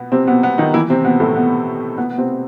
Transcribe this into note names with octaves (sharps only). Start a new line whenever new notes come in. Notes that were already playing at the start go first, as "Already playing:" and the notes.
Already playing: B2 B3
C3 C4
B2 B3
B2 B3
D#3 D#4
E3 E4
C3 C4
B2 B3
A2 A3
B2 B3
B2 B3
B3
C3 C4